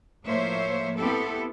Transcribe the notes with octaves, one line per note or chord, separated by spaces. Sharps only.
A2 F3 A#3 C5 C#5 E5
B3 C4 E4 G4 A4